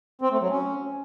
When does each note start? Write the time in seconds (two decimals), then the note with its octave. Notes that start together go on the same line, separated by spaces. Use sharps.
0.22 C4
0.31 A3
0.41 F#3
0.50 C#4